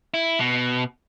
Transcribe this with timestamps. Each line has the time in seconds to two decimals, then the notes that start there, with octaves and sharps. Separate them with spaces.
0.14 E4
0.39 B2